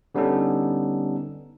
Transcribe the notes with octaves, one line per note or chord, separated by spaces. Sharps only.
D3 G3 B3 C#4 D#4 A4